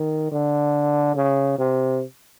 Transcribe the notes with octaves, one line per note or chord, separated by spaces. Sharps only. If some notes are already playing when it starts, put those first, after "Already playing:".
Already playing: D#3
D3
C#3
C3